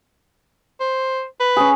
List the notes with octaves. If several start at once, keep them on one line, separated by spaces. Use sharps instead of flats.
C5
B4
C#4 G#4